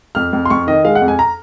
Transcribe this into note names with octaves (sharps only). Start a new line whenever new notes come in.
F2 F6
F2
C6
F2 C#6
D#3 D#5
G#3 F5
F#5
F2
G#5
A#5